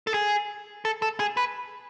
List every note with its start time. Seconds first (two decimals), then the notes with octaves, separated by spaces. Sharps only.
0.07 A4
0.14 G#4
0.85 A4
1.02 A4
1.20 G#4
1.37 B4